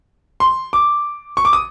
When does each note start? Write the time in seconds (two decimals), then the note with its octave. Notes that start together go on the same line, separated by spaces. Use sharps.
0.40 C6
0.73 D6
1.37 C#6
1.45 D6
1.53 D#6